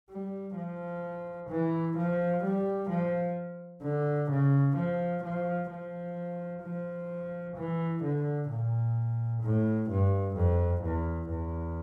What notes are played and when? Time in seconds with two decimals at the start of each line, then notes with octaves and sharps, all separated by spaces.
0.10 G3
0.56 F3
1.50 E3
1.97 F3
2.44 G3
2.90 F3
3.83 D3
4.30 C#3
4.76 F3
5.24 F3
5.70 F3
6.63 F3
7.57 E3
8.03 D3
8.50 A#2
9.43 A2
9.90 G2
10.36 F2
10.83 E2
11.30 E2